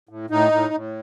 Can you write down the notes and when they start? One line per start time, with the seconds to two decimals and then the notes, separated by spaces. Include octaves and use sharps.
0.09 A2
0.30 A2 D#4
0.52 A2
0.74 A2